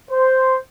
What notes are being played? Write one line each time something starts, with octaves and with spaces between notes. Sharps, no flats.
C5